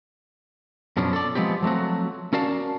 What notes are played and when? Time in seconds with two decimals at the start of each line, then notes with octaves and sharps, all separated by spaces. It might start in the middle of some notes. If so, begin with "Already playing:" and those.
0.97 F#2 B2 F3 C#4 D4
1.13 A4 D5
1.35 F3 G#3 B3 C4 G4
1.62 F3 F#3 A3 C4 F#4
2.33 C#4 F#4 A#4 D5 F5 A5